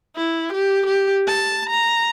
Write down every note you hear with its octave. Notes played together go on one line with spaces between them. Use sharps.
E4
G4
G4
A5
A#5